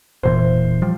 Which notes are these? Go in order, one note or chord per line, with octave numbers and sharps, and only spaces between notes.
E1 A#2 E3 C5
F3 G3